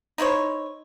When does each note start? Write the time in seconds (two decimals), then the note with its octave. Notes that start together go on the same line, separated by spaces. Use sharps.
0.18 D#4 E4 C5 C#5